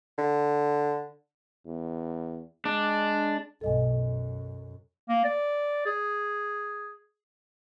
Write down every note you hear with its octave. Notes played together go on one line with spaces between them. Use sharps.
D3
E2
G#3 D4
B1 G2 A4 D#5 G#5
F#2
A#3
D5
G#4